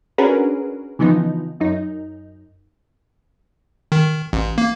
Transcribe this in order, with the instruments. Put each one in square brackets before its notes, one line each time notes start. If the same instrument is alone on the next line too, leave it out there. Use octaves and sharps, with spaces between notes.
[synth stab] C#4 D4 F#4 G#4 A#4 B4
C#3 E3 F3 B3 D#4
F#2 D#4
[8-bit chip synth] D#3
A1
A#3